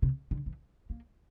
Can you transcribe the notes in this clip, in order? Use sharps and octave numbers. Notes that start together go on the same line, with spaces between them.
C3
D3
E3
A#3